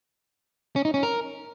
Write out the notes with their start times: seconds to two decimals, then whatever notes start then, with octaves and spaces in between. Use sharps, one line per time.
0.76 C#4
0.85 D#4
0.94 C#4
1.03 A#4